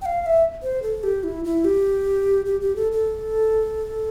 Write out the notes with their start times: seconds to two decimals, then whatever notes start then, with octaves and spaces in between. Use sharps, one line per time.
0.02 G5
0.06 F5
0.21 F5
0.26 E5
0.63 C5
0.82 A4
1.03 G4
1.24 E4
1.44 E4
1.65 G4
2.46 G4
2.61 G4
2.76 A4
2.92 A4